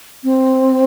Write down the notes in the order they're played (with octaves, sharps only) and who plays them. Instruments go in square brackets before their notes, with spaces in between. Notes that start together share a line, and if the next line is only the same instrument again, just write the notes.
[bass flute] C4